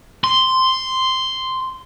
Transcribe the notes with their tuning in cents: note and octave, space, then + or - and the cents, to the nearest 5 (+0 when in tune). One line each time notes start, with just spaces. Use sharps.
C6 -5